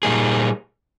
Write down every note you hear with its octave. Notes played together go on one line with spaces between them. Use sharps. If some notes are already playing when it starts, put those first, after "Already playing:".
A#2 G3 A#3 D#4 G#4